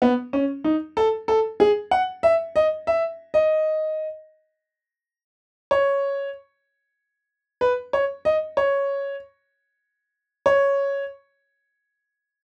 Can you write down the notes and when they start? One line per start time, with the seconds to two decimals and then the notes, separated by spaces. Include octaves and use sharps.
0.02 B3
0.33 C#4
0.64 D#4
0.97 A4
1.28 A4
1.60 G#4
1.91 F#5
2.23 E5
2.56 D#5
2.87 E5
3.34 D#5
5.71 C#5
7.61 B4
7.93 C#5
8.25 D#5
8.57 C#5
10.46 C#5